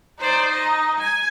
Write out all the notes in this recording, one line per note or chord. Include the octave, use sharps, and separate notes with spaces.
D#4 C5 D5
D#5
G#5